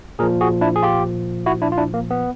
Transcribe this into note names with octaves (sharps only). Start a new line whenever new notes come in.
A#2 F3 G#4 A#4
F#4 G#4
D4 E4
G#4
F4 G4
E4 F#4
D4 E4
F4
D4 E4
A#3
B3